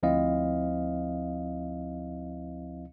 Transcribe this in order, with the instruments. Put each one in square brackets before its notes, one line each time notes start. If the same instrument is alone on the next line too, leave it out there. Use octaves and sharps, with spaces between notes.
[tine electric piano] D2 F3 C4 E4 D#5 F5